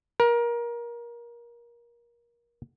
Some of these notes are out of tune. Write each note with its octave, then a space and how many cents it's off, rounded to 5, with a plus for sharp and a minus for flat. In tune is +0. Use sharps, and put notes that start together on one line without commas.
A#4 +25